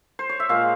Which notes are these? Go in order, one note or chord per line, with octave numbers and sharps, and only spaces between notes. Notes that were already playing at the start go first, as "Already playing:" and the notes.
C5
C#5
E5
A#2 G#3 F5